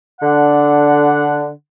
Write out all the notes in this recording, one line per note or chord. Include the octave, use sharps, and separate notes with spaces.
D3 F#5